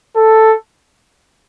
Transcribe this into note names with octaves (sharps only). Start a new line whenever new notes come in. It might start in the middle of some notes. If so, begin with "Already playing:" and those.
A4